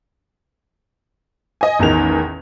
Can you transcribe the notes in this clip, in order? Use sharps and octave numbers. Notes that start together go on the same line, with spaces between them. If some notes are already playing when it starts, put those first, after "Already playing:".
D#5 G#5
A1 E2 D#3 F7